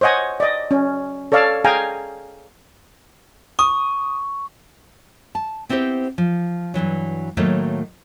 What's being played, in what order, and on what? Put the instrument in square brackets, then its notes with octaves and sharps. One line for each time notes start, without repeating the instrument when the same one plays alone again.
[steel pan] C5 C#5 D#5 F#5 G#5
D5 D#5
C#4
A4 C#5 D5 F5 A5
G#4 F5 G5 G#5 A#5
[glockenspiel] C#6 [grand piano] D#6
[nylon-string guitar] A5
B3 C4 E4 G4 C5
F3
G2 B2 E3 F#3
A2 D#3 F#3 A3 A#3 D#4